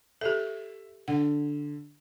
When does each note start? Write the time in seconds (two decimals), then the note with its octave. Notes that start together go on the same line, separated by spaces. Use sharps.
0.21 G4 A4 E5
1.08 D3 F#5